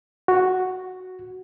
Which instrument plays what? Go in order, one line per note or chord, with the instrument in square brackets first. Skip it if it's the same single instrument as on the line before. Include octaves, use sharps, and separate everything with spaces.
[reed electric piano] F#4